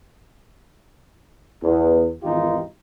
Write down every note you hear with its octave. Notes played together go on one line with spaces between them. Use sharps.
E2
G#1 E2 D#3 D#4 F4 G4